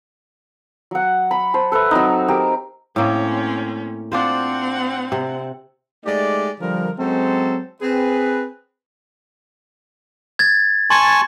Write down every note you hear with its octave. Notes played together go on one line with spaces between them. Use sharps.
F#3 F#5
B5
C5 A5
A4 B4 C5 E5
F#3 C4 D#4
G4 A#4
A2 A#3 C4 C#4
C4 D4 F4 C5 F#5
C3
G#3 A3 D#4 G4 D5
D3 F3 G3 A#4
F#3 G#3 C4 C#4 A4 C5
C4 G#4 B4
G#6 A6
G#5 A5 C6 C#6